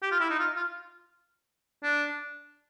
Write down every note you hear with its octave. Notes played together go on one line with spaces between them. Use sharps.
G4
F4
E4
D#4
F4
F4
D4